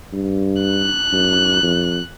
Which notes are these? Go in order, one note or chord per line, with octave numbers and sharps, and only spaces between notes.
G2
F#6
F#2
F2